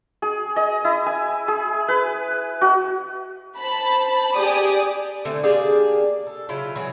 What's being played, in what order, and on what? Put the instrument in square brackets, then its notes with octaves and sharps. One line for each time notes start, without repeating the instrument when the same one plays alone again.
[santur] G#4
D#5
E4
G#5
G#4
B4
F#4
[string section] C5 A5 B5
G4 G#4 D5 D#6
[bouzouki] D3 A3 C4
A#3 D4 G4 G#4
A4
C#3 F#3 E4 F4
E3 F#3 G#4